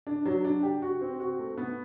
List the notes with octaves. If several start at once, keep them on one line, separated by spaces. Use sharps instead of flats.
D4
F#3
D4
G4
F#4
C4
F#4
A3
B3